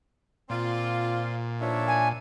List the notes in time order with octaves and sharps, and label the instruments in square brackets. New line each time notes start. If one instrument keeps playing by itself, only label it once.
[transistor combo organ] A#2 [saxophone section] C4 F4 [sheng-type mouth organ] D5 C6
[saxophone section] A2 D#3 F3 [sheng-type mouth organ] D4 C#5 E5
[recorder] G#5